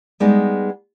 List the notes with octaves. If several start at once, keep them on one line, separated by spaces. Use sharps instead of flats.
G3 G#3 B3 D#4